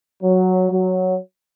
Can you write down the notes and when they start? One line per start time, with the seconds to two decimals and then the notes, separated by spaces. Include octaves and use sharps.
0.22 F#3
0.71 F#3